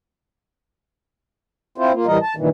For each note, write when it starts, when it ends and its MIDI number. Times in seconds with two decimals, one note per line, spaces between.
1.78 1.92 60
1.78 1.92 64
1.78 1.92 65
1.78 1.92 72
1.93 2.06 58
1.93 2.06 65
2.06 2.18 45
2.06 2.18 52
2.06 2.18 55
2.06 2.18 70
2.06 2.18 75
2.22 2.34 81
2.37 2.49 43
2.37 2.49 46
2.37 2.49 51
2.37 2.49 52